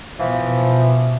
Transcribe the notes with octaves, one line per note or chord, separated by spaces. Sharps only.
B2 E3 F3